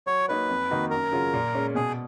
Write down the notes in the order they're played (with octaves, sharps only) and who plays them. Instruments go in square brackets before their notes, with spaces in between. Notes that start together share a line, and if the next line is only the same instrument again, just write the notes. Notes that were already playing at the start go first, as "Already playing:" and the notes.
[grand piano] F#3 [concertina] C#5
[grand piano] A#3 D#4 F#4 C#5 [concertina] B4
[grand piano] F2
D#3 A#3 D#4 F#4
[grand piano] F#2 [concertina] A#4
[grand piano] C#3 F#3 C#4 F4
A#2
G#3 C#4
[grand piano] B2 [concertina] G#4